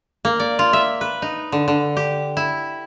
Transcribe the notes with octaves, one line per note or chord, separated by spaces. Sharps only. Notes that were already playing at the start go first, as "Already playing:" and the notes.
A#3
D5
F4
E5
B4
D#4
D3
D3
G4
E4